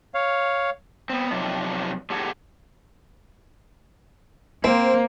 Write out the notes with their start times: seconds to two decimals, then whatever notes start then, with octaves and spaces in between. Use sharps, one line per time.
0.14 C#5 F5
1.10 B3 C4
1.31 C3 F3 F#3 D4 D#4
2.10 A2 G4 G#4 F#5 A5
4.64 A#3 C4 C5